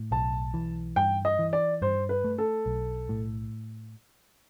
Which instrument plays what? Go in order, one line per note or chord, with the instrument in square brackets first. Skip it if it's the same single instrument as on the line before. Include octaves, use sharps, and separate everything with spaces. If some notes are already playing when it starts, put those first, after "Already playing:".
Already playing: [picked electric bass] A2
[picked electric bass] B1 [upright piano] A5
[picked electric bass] E3
[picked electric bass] G2 [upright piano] G5
[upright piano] D#5
[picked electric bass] E3
[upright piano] D5
[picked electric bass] G2 [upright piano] C5
[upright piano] B4
[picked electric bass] A3
[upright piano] A4
[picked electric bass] B1
A2